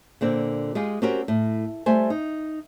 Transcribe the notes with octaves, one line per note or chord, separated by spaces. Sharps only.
A#2 D3 C4
G#3 F4 G4 G#4
C4 C#4 F#4 G4 A#4
A2
G3 A3 C5 G#5
D#4